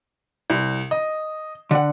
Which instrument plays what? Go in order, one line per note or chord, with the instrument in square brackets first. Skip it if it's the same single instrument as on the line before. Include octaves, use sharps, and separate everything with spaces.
[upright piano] C2
D#5
[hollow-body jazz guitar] D3 F#5